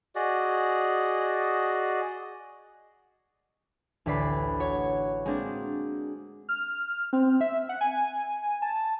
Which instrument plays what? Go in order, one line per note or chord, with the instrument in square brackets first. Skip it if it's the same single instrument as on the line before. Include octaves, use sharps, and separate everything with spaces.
[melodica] F#4 G#4 D5 D#5
[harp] A1 D2 B4 D5 B5 C7
F#4 C#5
G#3 A#3 C4 D4
[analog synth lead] F6
C4
E5
F#5
G#5
A5